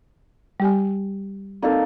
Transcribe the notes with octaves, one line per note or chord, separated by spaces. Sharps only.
G3 G4 G#5
A#3 C4 D#4 A4